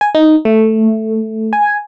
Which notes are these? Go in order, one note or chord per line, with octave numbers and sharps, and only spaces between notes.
G#5
D#4
A3
G#5